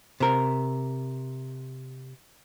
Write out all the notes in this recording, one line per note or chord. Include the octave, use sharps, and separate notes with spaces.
C3 A#4